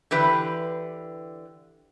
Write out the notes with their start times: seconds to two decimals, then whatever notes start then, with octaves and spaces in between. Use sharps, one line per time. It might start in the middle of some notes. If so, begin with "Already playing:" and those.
0.11 D3 E3 G4 B4